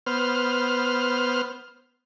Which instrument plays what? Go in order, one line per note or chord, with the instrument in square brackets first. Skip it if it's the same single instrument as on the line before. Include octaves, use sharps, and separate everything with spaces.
[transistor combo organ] B3 C5 F6